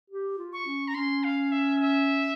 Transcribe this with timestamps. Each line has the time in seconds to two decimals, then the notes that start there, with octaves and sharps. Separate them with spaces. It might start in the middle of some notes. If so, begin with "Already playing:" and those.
0.10 G4
0.38 F4
0.53 C#6
0.66 C#4
0.88 A#5
0.95 C#4 C6
1.24 F5
1.52 E5
1.80 E5